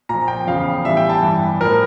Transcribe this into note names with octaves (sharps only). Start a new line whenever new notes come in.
A#2 F3 A#5
G5
E2 C#3 F3 F5
A2 E3 G3 E5
G5
A5
G2 E3 G3
A2 F3 A#4